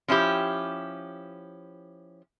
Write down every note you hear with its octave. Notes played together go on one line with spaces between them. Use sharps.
F3 C#4 E4 G4